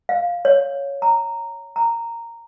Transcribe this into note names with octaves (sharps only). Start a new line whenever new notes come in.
F5
C#5
A#5
A#5